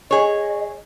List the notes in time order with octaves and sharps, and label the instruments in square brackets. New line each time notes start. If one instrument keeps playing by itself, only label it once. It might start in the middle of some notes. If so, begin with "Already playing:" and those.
[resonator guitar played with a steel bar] G#4 C#5 [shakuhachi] D#5